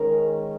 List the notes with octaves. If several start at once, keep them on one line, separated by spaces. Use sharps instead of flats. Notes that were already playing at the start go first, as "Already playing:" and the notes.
Already playing: D#3 G#3 C#4 A#4